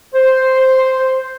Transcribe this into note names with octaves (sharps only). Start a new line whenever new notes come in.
C5